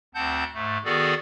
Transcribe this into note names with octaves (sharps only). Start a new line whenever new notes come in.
D2 C4 F#5 A5 G6
G#2 A3
D#3 B3 F#4 G#4 A4 D5